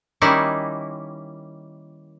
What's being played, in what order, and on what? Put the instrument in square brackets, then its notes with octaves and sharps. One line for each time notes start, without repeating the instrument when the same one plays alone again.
[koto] D#3 G3 A#3 C#4 D#4 E4